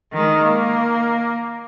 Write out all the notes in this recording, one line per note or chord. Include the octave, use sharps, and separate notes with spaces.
D#3 G#3
A#3